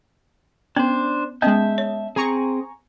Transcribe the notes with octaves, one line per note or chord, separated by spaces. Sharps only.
B3 C#4 D4 C5
G#3 B3 C#4 D#5 E5 A5 G6
C#5
C4 G#4 G#5 A#5 C#6